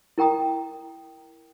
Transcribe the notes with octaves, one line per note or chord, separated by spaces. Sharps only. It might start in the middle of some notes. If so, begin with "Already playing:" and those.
E4 A#4 G5 A#5 D#6